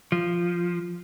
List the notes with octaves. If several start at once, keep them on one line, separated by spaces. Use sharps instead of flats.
F3